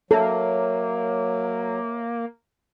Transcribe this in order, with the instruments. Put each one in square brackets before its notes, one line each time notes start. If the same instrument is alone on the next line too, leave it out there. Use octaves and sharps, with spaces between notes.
[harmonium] F#3 [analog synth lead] A#3 [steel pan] A4 [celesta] C#5 E5